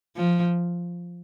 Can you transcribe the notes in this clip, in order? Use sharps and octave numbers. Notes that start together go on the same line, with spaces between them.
F3